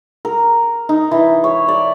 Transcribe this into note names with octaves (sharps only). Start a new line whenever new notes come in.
A#4
D#4
E3
C#5
D5